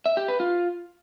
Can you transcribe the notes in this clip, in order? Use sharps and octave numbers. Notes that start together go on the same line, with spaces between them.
E5
G4
B4
F4